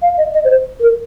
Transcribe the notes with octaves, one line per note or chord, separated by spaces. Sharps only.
F5
D#5
D#5
C5
A#4